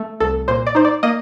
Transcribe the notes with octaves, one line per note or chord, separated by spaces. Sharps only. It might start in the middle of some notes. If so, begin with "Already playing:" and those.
Already playing: A3
C2 A4
A#2 C5
D5
D#4 C5
D5
A#3 D#5